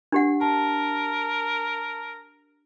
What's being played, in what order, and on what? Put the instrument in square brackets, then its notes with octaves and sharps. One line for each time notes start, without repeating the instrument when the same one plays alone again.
[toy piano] D4 G4 F#5
[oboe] A#4 [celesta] A5